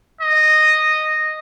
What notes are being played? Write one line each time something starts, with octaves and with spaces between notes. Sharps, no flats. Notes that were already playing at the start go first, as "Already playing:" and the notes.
D#5